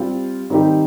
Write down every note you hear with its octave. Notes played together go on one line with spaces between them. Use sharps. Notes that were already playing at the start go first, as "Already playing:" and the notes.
Already playing: G3 C4 F4
D#3 G3 C4 D#4 G4